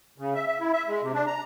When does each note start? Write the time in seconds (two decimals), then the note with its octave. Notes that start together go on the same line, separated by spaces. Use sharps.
0.18 C#3
0.35 E5
0.46 E5
0.60 E4
0.73 E5
0.88 G#3
1.02 C3
1.14 D4
1.27 A#5